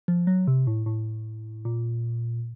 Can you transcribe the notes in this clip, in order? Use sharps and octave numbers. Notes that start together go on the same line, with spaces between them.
F3
F#3
C3
A2
A2
A#2